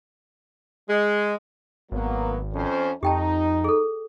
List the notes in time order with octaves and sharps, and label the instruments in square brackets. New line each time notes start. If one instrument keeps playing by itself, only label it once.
[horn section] G#3
[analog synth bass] G#1 [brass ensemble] F#3 A#3 B3
[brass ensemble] F2 C#4 C5
[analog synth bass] F2 [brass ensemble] D#4 [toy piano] G4 G5 A5
[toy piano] G#4 A4